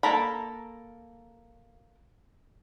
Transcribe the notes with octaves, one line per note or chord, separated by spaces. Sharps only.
A#3 A4 A#5 B5